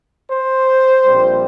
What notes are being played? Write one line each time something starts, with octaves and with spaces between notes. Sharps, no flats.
C5
A#1 A#2 G3 C4